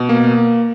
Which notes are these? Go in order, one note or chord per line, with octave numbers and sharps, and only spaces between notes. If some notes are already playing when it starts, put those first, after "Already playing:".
Already playing: B2
A#3